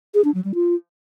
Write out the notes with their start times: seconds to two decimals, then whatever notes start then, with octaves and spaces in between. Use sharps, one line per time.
0.14 G#4
0.24 D4
0.34 F#3
0.45 G3
0.55 F4